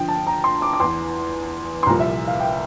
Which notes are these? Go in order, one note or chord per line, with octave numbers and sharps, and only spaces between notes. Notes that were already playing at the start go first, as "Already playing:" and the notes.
Already playing: G2 D3 F3 G5
A5
A#5
C6
D6
D6
E2 E3 C6
C6
C2 A#2 F3 A#5
E5
F5
G5